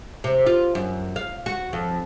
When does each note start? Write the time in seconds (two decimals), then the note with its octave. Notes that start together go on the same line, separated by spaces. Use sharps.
0.24 C3
0.46 F4
0.75 F#2
1.16 F5
1.46 F#4
1.73 F2